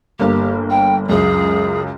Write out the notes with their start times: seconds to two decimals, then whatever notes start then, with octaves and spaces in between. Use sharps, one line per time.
0.19 G1 A#3 G4
0.70 G5
1.09 C#2 F#2 G#4